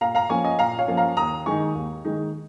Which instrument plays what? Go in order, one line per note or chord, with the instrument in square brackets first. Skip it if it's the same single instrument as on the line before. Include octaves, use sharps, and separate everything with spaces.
[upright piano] A#2 F5 A#5
F5 A#5
F3 A#3 C#4 G#5 C#6
D#5 G#5
A#2 F5 A#5
C#5 F5
F3 A#3 C#4
F5 A#5
D#2 A#5 D#6
D#3 G#3 D#4 G#5 C#6
D#2
D#3 G#3 D#4